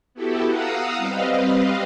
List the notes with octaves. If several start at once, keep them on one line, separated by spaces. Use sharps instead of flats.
B3 E4 F#4 G4 A4
F5 F#5 A#5 D#6 E6
G3 C4 B4 D#5 F5